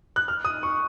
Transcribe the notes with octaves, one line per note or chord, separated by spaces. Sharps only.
F#6
F6
D#6
C#6